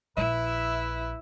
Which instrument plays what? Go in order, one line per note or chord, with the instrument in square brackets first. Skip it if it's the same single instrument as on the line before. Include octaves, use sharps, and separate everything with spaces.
[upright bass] A#1 [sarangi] E4 [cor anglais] B4 [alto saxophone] E5